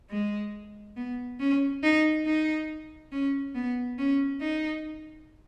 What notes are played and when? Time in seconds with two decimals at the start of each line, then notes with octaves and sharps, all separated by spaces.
0.11 G#3
0.97 B3
1.40 C#4
1.83 D#4
2.26 D#4
3.12 C#4
3.55 B3
3.98 C#4
4.41 D#4